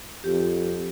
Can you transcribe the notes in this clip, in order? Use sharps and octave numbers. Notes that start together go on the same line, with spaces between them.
F2 G4